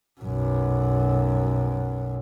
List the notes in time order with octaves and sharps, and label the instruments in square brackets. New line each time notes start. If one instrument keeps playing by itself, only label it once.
[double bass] B1 F#2